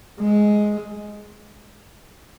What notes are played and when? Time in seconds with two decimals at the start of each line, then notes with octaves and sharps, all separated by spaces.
0.20 G#3